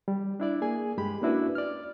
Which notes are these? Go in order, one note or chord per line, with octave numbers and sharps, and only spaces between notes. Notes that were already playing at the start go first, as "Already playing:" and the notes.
G3
D4 E4 D5
A#3 G#4 G#5
G2 G#3 G4 B5
A#3 C#4 D4 E4 F#4 B4
D5 F6